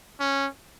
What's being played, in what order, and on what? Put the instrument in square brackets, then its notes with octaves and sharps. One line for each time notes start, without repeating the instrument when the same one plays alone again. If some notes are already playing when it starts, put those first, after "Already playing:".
[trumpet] C#4